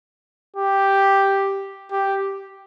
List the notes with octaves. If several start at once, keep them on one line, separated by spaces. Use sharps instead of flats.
G4
G4